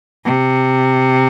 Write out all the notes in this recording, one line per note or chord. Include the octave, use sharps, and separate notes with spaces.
C3